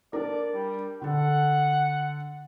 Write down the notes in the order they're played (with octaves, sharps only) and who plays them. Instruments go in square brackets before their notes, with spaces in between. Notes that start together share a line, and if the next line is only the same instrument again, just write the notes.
[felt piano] D4 A#4 [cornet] D5
[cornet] G3
[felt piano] D3 A4 [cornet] F#5